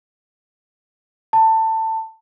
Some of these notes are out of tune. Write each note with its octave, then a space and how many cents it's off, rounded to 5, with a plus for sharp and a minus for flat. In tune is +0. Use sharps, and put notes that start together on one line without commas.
A5 +20